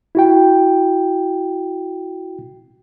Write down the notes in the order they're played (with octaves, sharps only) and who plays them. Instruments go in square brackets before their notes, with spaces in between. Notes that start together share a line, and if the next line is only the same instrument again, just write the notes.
[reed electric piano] E4 F#4 G5